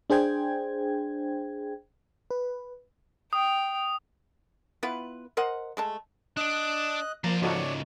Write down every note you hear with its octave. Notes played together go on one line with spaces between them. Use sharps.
D4 G#4 C5 G5 G#6
B4
G5 D#6
B3 E4 F4 B4
A#4 C5 D#5 F#5
G#3 A3 A5
D4 D5 D#5 F#6
F3 A#3 C5 D5 A#5
C#2 G#2 D#4 F#4 A4 C#5 D5 C#6